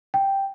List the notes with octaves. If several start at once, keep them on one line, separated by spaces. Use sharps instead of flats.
G5